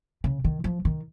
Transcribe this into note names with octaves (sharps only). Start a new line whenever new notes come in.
C#3
D#3
F3
D#3